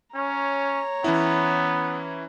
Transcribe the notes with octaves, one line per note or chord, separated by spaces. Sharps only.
C#4 C#5 A#5
E3 B3 C#4 E4